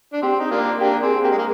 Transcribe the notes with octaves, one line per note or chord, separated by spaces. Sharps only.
D4
C4 G4
D#4
A#3 D4 F4
A#3 D4 G4
C4 G#4
A#3 G4
G#3
A#3